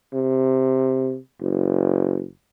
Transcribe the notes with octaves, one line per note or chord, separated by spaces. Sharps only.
C3
F#1